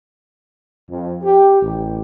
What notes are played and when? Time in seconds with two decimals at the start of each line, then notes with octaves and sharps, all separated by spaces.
0.89 F2
1.23 G4
1.61 A1